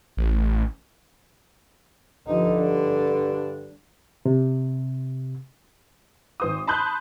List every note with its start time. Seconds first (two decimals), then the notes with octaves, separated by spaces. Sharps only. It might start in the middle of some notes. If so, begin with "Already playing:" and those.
0.17 A1
2.27 G2 D3 F3 D#4
2.60 G3 D4
4.26 C3
6.40 G#1 C5 D#6
6.67 A5 B5 C6 D#6 F#6 G6